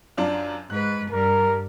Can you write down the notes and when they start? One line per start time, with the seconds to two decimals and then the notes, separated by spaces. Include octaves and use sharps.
0.17 F#2 D4 F4
0.70 G#2 B4 F#6
1.11 G2 G3 A#4